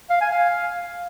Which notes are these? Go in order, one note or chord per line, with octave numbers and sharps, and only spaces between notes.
F5
G#5
F5